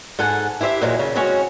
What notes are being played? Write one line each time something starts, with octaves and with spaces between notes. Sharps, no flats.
G#2 A4 F#5 G#5
E4 G4 C5 D5 E5
E2 A#2 F#3 G#3
C#3
G#3 C4 C#4 F#4 C#5